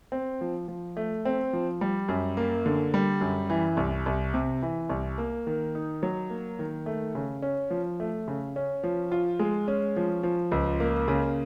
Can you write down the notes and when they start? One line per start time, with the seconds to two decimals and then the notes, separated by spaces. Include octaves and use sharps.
0.12 C4
0.41 F3
0.68 F3
0.97 A3
1.25 C4
1.53 F3
1.81 G3
2.09 F#2
2.37 A#3
2.66 D3
2.94 G3
3.21 F#2
3.50 E3
3.77 C2
4.06 C2
4.34 C3
4.62 E3
4.90 C2
5.18 A#3
5.47 D#3
5.75 D#4
6.03 F#3
6.30 A#3
6.59 D#3
6.86 A3
7.15 C#3
7.42 C#4
7.71 F3
8.00 A3
8.28 C#3
8.56 C#4
8.84 F3
9.12 F4
9.39 G#3
9.68 C#4
9.96 F3
10.23 F3
10.51 C#2
10.80 A#3
11.08 C#3